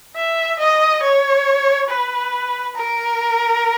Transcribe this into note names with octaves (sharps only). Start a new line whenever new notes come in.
E5
D#5
C#5
B4
A#4